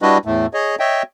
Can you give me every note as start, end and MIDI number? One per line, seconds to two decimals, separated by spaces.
0.02 0.18 55
0.02 0.18 62
0.02 0.18 64
0.02 0.18 66
0.02 0.18 71
0.02 0.18 75
0.25 0.46 40
0.25 0.46 45
0.25 0.46 57
0.54 0.76 68
0.54 0.76 73
0.54 0.76 75
0.79 1.03 73
0.79 1.03 75
0.79 1.03 76
0.79 1.03 79